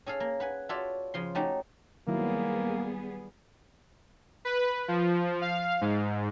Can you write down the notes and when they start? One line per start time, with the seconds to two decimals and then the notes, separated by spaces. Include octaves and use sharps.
0.06 C#4 G#4 A4 F5
0.20 A#3
0.40 B4 F#5 G#5
0.69 F4 F#4 A4 C#5 D5 E5
1.14 C#3 F3 C6
1.35 A3 C#4 D#4 F#4 G4
2.07 D#3 F#3 G3 A#3 B3 E4 G#4
4.45 B4
4.88 F3
5.42 F5
5.81 G#2